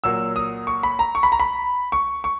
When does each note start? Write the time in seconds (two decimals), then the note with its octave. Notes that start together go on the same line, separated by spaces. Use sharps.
0.04 A#2 F#3 A#3 E6
0.36 D#6
0.67 C#6
0.83 B5
0.99 A#5
1.15 C#6
1.23 B5
1.32 A#5
1.40 B5
1.92 C#6
2.24 C#6